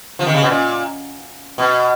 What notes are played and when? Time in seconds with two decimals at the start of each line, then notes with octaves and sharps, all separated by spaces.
0.19 F3
0.27 D#3
0.34 C#3
0.42 B2
0.49 A#2
1.58 B2